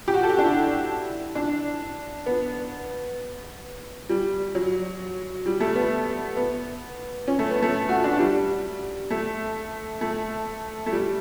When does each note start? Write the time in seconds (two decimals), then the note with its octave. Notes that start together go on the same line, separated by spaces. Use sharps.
0.08 G4
0.14 F#4
0.23 A4
0.29 G4
0.38 D4
0.44 E4
1.35 D4
2.26 B3
4.09 G3
4.55 F#3
5.46 G3
5.60 A3
5.75 B3
6.37 B3
7.28 C#4
7.39 A3
7.51 B3
7.62 A3
7.89 F#4
8.04 D4
8.19 G3
9.10 A3
10.01 A3
10.86 A3
10.92 G3